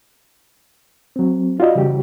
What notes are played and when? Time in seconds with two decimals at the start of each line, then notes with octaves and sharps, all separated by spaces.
1.16 F#3 C4
1.59 D#4 F4 F#4 D5 D#5
1.75 C#3 E3 G3 F#4 G4